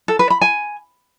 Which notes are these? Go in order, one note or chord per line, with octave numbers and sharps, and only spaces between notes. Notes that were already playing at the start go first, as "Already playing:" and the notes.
A4
B4
B5
G#5